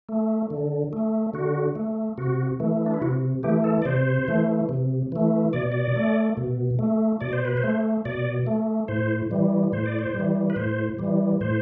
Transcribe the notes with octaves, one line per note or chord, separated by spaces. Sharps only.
A3
D3
A3
D3 F#4
A3
C3 F#4
E3 A3
D4
E4
C3 F#4
E3 A3 G4
A4
D5
C3 C5
E3 A3
C3
E3 A3
B2 D5
D5
A3
B2
A3
B2 D5
C5
B4
C5
A3
B2 D5
A3
A2 C5
E3 G3
A2 C5
D5
C5
G3
E3
B4
A2 C5
E3 G3
A2 C5